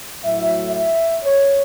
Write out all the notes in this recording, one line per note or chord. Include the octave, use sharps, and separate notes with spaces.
A2 F#3 E5
E5
C#5